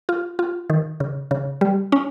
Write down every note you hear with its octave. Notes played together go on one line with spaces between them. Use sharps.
F4
F4
D#3
C#3
C#3
G3
C#4